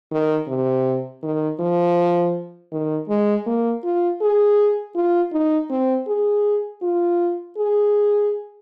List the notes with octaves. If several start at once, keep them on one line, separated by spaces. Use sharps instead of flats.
D#3
C3
D#3
F3
D#3
G#3
A#3
F4
G#4
F4
D#4
C4
G#4
F4
G#4